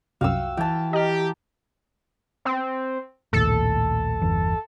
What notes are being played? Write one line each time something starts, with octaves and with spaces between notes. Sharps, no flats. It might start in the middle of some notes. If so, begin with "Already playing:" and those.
C2 F#2 F#4 F5 G5 E6
E3 G5 A5
G4 D#5 A#5 F6
C4
A#1 D#2 A2 A4
G1 E2